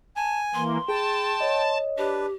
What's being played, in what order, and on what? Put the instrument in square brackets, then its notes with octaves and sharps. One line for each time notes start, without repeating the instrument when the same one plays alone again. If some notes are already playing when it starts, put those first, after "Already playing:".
[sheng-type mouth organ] G#5 [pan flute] A5
[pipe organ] E3 A#3 [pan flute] C6
[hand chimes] G#4 [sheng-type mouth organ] G5 [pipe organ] A5
[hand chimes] C#5 D#5
[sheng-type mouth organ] D4 B4 [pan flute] G4